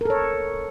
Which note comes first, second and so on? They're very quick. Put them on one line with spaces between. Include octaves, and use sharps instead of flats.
A#4 A4 C#5